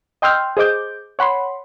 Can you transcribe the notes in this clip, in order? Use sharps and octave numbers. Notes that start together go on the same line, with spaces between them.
D#5 G5 C6 E6 F6 G6
G#4 C5 D#5 D6 G6
C#5 F#5 B5 C6